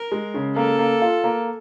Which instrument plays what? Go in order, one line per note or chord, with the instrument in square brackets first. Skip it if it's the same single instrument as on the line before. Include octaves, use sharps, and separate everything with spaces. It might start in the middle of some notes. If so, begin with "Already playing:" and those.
Already playing: [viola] A#4
[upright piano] G#3
C#3
[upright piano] A#3 [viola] A4
[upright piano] A#3
F4
A#3